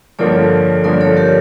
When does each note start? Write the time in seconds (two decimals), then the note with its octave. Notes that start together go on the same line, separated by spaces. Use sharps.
0.19 G2 D3 F3 A#3 A4 C#5
0.84 G2 D3 F3 A#3 A#4 D5
1.01 A4 C#5
1.17 G4 A#4